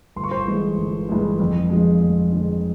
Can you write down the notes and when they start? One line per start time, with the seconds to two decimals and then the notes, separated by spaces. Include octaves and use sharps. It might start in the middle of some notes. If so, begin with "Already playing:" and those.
0.16 G1 C6
0.24 C#6
0.31 C5 C6
0.47 G2 E3 G#3
0.78 G1
1.09 G2 E3 G#3
1.40 F2
1.70 D3 F3 G#3
2.02 F2
2.32 D3 F3 G#3